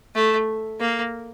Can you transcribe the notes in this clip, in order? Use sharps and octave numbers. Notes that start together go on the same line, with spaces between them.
A3
A#3